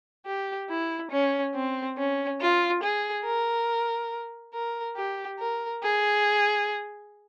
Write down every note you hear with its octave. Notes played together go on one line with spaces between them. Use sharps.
G4
E4
C#4
C4
C#4
F4
G#4
A#4
A#4
G4
A#4
G#4